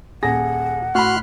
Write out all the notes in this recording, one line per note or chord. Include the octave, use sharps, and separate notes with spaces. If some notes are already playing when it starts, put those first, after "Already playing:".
D#1 G#4 F#5 A#6
A2 F#4 B5 C6 F6 F#6